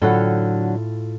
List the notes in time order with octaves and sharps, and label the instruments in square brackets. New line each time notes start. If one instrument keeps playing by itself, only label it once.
[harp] A2 F4 A4 [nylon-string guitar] D3 F#3 F#5